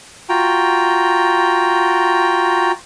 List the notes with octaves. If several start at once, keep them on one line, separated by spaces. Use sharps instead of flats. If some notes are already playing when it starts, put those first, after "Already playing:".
F4 F#4 G5 A#5